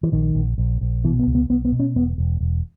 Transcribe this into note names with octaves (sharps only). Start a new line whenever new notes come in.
E3
A#1 D#3
A#1
A#1
A#1
B2 E3
B3
C#2
B3
B1 B3
B3
B2
C#4
E1 B3
E1
E1